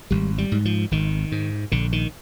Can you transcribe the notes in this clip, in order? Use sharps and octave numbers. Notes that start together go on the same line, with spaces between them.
G#1 G3
G3
G#2
F3
G#1 D#3
G#2
A#1 D3
D#3